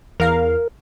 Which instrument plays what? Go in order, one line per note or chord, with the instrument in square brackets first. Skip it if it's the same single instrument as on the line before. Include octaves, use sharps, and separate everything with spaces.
[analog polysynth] E2 F5 [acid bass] A#4